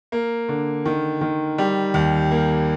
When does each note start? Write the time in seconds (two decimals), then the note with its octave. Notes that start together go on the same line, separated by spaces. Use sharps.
0.12 A#3
0.49 D3
0.85 D#3
1.21 D#3
1.58 G3
1.94 D#2
2.31 A#3